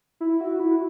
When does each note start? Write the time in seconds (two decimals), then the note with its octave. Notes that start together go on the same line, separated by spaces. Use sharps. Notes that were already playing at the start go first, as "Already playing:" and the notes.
0.21 E4
0.41 F#4
0.60 E4